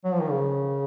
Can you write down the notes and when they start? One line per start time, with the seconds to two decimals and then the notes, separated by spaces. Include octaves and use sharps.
0.05 F#3
0.12 F3
0.21 D#3
0.30 C#3